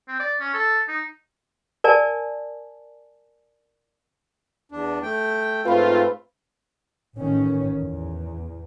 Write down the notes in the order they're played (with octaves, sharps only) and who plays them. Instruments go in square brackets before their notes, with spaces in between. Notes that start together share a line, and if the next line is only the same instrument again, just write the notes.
[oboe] C4
D5
C#4
A4
D#4
[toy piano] A#4 D5 G#5 A5
[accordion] E2 D4
A3 G5
[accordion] G#2 A3 [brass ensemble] C4 F4 [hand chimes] B4 B5
[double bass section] A1 D#3 C#4
E2